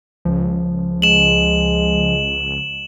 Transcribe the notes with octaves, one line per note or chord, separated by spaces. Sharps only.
C#2 F3
G#3 E7 F#7